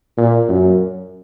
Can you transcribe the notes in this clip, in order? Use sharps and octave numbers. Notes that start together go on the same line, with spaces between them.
A#2
F#2